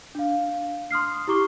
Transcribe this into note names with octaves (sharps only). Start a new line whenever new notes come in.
D4 F5
C6 D#6 F6 C7
E4 G4 A#5 C#6 D6 G7